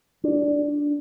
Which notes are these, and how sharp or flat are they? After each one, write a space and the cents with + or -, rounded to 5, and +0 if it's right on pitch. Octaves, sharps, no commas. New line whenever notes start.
D4 -5